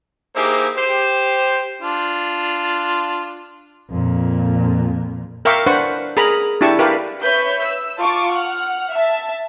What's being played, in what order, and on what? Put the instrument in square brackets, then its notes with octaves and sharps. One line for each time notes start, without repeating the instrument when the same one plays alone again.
[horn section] A#3 D#4 E4 G4 G#4 C5
G4 C5
[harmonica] D4 F4
[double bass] F2 A#2
[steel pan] A#4 E5 F5 G5 C#6 D6
D4 B4 C5 F#5 C#6
G#4 A#4 A#5 B5
D4 E4 G4 A5 C#6
G4 A#4 B4 D5 F5
[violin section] B4 C#5 E5 G6 B6
E6
F4 A5 C#6 D6
F#5 F6
E5 A5